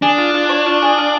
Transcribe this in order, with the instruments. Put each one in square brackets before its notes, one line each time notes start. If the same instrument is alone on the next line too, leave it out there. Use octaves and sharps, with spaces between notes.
[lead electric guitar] D4 [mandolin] G#4
[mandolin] F4
F4
C#5
F4
G#4
F4